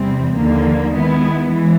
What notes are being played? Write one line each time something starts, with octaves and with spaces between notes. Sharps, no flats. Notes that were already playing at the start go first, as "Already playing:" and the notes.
Already playing: E2 C3 E3 G3 C4
D#2 D3 F3 A#3
D#3 G#3 B3 E4
E3 G#3